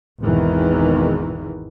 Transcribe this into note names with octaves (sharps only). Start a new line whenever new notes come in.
G#1 E2 B2 D#3 E3